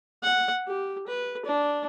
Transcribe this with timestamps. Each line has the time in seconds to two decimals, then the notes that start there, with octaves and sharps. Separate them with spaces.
0.23 F#5
0.67 G4
1.07 B4
1.45 D4